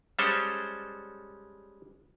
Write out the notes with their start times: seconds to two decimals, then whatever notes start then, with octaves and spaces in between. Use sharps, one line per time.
0.19 G3 G#3 C#4 A4 C5